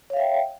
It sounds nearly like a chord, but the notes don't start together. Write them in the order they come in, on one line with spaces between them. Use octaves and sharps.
C#5 F5 E5 G5